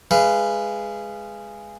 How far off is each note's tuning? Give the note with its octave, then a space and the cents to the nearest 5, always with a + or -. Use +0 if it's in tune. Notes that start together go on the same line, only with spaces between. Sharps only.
G#3 -5 B4 +0 F5 -25